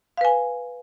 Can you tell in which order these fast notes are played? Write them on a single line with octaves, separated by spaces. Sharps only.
F5 B4 G#5